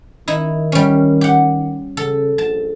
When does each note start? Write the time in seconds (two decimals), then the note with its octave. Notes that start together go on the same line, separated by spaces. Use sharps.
0.28 D#3 D#4 E4
0.72 G3 C#4
1.21 G4 F#5
1.97 C#3 A4
2.38 A#1 A5